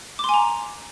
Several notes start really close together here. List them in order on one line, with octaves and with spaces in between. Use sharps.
D6 C6 G#5 A#5